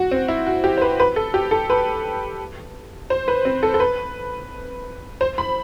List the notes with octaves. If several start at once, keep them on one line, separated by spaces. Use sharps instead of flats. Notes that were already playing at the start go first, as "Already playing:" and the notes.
Already playing: F#4
C4
E4
F#4
G4
C5
B4
B4
A4
G4
A4
B4
C5
B4
C4
A4
A4
B4
C5
B5